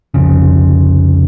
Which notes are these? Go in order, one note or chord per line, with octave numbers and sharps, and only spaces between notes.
C2 F2 C#3